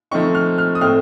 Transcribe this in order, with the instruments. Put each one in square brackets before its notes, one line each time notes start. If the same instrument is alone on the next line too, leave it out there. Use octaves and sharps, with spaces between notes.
[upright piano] F3 A3 C4 D#4 C#6
F6
F6
D#6
A2 A3 C4 F6